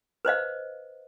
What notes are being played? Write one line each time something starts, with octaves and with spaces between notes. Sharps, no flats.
B4 C5 D#5 F5